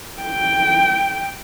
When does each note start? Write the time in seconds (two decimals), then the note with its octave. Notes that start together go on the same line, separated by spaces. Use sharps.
0.22 G5